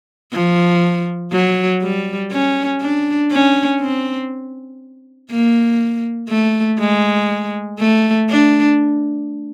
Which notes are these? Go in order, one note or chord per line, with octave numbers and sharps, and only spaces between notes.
F3
F#3
G3
C#4
D4
C#4
C4
A#3
A3
G#3
A3
D4